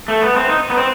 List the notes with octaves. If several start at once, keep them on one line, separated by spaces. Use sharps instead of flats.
A3
B3
C4
D#4
B3
C4